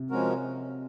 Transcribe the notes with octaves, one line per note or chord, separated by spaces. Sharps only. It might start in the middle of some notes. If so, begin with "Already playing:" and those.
Already playing: C3
F3 G#3 C#4 F#4 A#4